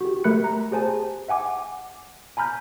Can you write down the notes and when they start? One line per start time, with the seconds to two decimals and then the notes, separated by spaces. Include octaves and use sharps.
0.01 F#4 G4
0.24 A3 A#4 B5 F#6 C#7
0.44 A#5
0.71 G4 G#4 C5 G#5 A5
1.28 E5 F#5 G#5 D6
2.37 G#5 A#5 B5 F6 G6